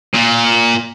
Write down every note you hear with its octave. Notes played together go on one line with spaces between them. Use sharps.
A#2